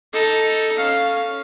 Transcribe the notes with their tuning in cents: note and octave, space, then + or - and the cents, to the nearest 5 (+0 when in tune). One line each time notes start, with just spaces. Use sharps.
D#4 +10 A4 +0
C#4 +0 F5 +0